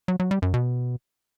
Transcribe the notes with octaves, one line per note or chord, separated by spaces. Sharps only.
F#3
F#3
G3
F#2
B2